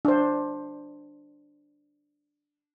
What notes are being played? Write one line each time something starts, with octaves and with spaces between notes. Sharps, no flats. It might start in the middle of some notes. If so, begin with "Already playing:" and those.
D4 C5